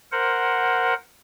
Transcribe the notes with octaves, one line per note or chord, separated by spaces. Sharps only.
A#4 C5 F#5